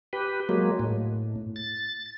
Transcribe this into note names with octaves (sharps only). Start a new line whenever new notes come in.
G4 B4
F#3 G#3 A#3
A2
A6